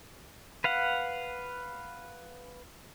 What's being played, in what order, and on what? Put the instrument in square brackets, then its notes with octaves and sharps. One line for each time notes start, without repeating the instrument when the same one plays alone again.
[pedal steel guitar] B4 F5 F#5